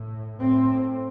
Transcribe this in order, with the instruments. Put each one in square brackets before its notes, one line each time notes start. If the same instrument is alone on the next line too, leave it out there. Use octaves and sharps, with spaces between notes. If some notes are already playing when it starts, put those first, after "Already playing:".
Already playing: [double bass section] A2
A2 C4